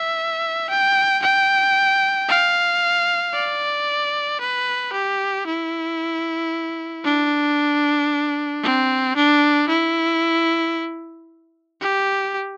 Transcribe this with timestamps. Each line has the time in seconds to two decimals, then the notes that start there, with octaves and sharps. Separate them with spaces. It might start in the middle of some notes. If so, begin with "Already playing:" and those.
Already playing: E5
0.70 G5
1.23 G5
2.29 F5
3.34 D5
4.41 B4
4.93 G4
5.47 E4
7.05 D4
8.63 C4
9.16 D4
9.69 E4
11.81 G4